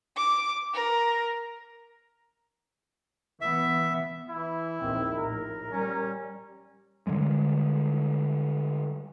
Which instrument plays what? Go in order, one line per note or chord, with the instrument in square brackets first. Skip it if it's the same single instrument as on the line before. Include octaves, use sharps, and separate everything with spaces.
[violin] D6
A#4
[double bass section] E3 B3 [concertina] E5
[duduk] E3 [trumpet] E4
[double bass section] A#1 D#2 D#3 [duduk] C4
[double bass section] A#1 A2 [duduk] A#4
[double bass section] G3 [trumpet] C#4
[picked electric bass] D3 D#3 G3 G#3